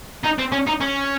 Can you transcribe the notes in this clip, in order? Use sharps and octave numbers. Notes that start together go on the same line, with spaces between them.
D#4
C4
C#4
D#4
C#4